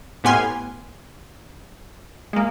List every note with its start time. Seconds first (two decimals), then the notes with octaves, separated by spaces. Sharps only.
0.24 A2 B3 G4 G#5 C6 F6
2.33 G#3 A#3